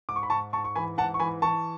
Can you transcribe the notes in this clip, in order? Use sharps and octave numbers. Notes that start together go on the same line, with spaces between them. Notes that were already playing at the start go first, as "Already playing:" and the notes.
G#2 D6
C#6
B5
G#2 A5 C#6
G#2 A5 C#6
C#6
E3 G#5 B5
G#2 F#5 A5
C#6
E3 G#5 B5
E3 A5 C#6